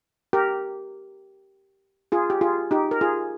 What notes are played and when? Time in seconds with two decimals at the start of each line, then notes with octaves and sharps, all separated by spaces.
0.33 G4 A#4
2.12 F4 G#4
2.30 G4
2.41 F4 G#4
2.71 D#4 G4
2.91 A#4
3.01 F4 G#4